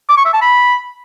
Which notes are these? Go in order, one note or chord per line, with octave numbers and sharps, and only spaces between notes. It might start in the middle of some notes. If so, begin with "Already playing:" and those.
D6
C#6
E5
A5
B5